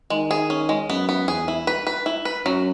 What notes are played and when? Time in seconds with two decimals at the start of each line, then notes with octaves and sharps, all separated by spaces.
0.10 D#3 G#3
0.31 G#4
0.50 C#4
0.69 G#3
0.89 F#2 B3
1.09 B3
1.28 E2 G#4
1.48 E4
1.67 B4
1.87 B4
2.06 E4
2.25 B4
2.45 F#2 F#3